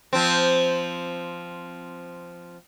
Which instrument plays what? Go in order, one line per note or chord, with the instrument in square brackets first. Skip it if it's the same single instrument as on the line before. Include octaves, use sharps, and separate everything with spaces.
[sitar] F3 C4